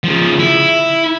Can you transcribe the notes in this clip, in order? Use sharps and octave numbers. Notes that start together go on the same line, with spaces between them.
C#3 F3
E4